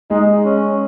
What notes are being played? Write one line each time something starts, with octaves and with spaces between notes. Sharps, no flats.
G#3 D#4
C#4